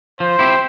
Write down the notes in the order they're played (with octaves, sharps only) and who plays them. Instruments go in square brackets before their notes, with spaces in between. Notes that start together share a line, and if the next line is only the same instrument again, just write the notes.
[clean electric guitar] F3 [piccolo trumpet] C5
[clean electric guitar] C4 E4 G4